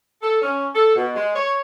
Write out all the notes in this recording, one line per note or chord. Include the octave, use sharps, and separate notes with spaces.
A4
C#4
A4
B2
G#3
C#5